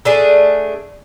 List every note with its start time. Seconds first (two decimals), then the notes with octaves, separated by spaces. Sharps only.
0.05 A3 D4 G#4